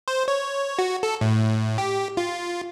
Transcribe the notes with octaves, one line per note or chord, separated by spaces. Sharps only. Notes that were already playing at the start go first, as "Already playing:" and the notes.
C5
C#5
F#4
A4
A2
G4
F4